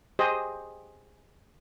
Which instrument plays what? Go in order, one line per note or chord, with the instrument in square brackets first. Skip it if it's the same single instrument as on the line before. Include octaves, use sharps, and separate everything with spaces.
[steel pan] G4 G#4 C5 D#5